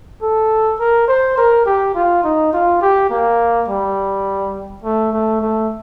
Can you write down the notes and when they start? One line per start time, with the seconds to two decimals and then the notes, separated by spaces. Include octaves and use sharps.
0.22 A4
0.80 A#4
1.08 C5
1.37 A#4
1.66 G4
1.95 F4
2.24 D#4
2.53 F4
2.82 G4
3.10 A#3
3.68 G3
4.84 A3
5.13 A3
5.42 A3